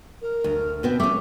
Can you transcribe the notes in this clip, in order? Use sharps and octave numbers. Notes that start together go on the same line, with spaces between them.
A#4
D2
B2 B3 C4
A3 C#4 D6